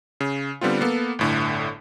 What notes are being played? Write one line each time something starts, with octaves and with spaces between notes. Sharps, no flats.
C#3
D3 G3 B3 C4 F4
A#3 B3 A4
G1 A2 D3